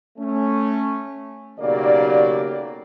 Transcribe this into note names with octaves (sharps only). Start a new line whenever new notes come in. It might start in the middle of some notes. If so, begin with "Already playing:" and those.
A3 C#4
B1 C#3 F#3 A#3 G4 D5